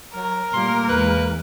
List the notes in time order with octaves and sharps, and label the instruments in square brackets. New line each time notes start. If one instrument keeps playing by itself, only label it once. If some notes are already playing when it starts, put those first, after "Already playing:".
[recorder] F#3 [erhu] A#4
[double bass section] A#2 G3 A3 [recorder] A#3 [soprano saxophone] C6
[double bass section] E2 E3 G#3 [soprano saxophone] B4